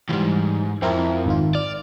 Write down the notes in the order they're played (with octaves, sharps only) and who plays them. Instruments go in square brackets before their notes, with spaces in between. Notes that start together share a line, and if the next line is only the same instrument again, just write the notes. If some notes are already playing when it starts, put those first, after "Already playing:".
[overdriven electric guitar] C#2 G#2 [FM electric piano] E3 G3
[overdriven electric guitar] F2 [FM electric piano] C4 E4 A#4
[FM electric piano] G#1 D#3 F4
[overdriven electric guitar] D5 [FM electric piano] F6